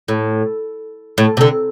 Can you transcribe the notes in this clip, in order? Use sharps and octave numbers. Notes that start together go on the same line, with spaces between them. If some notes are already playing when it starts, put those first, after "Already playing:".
A2
A2
C3
D3